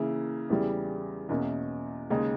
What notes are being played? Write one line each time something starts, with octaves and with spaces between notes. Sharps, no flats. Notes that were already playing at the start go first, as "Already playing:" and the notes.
Already playing: C#3 E3 A#3 E4
E2 C#3 E3 G3
E2 B2 A#3 C#4 E4
D#2 C#3 G#3 D#4